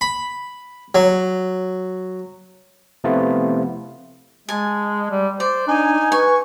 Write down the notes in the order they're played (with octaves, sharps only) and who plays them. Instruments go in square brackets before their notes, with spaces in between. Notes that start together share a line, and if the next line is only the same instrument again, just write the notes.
[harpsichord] B5
F#3
[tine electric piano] C3 F3 A3 B3 E4 F4
[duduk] G#3 [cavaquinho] G#5 A5
[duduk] G3
[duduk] C5 [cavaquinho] D5
[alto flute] D4 [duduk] D#4 [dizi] G#5
[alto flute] B4 [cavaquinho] G#5 [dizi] C#6